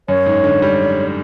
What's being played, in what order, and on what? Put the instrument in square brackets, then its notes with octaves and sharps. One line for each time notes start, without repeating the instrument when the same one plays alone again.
[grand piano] F#2 [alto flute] C#5
[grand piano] G#2
D3
G3